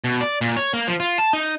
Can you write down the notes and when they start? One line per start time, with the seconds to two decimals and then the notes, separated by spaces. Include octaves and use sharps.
0.04 B2
0.21 D5
0.41 A#2
0.57 C#5
0.74 A#3
0.88 F3
1.00 F4
1.18 A5
1.33 D#4